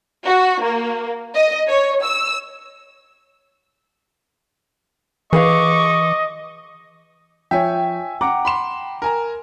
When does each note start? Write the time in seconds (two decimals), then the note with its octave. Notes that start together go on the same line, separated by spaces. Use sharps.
0.24 F#4
0.63 A#3
1.35 D#5
1.68 C#5
2.03 E6
5.33 E3 G#4 B4 D#5 F5 C#6 D6
7.51 F3 C#5 E5 G5 G#5
8.21 F#5 A#5 D6
8.45 B5 C6 E7
9.02 A#4 G#5 A#5